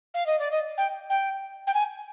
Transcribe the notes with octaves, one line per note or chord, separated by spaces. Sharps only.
F5
D#5
D5
D#5
G5
G5
G5
G#5